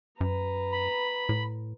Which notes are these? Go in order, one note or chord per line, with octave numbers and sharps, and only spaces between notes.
F#2 B4 A#5
B5
A2